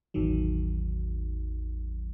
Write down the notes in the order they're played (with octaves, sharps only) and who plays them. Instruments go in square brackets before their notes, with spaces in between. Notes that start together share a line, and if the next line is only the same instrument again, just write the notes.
[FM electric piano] A1 E2 D#3 F#3